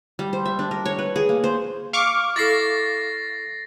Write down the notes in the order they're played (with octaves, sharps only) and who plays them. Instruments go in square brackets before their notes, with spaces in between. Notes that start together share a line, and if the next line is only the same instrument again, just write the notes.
[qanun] G3
C5
E5
D4
A#4
C#5
B4
G#4
A#3
C5
[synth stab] F5 C#6 D6
[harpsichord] E4 A4 [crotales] A6 A#6 C7